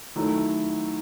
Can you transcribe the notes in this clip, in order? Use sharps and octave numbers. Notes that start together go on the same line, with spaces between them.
D#3 F#3 A3 E4